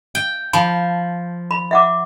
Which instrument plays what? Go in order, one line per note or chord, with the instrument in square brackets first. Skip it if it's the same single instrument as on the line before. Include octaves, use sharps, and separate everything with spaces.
[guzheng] G5
[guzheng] F3 [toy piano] A5 B5
[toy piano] B5
E5 F#5 D6